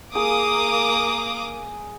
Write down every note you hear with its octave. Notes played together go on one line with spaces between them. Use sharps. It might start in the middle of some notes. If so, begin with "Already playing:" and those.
A#3 G#4 D6 D#6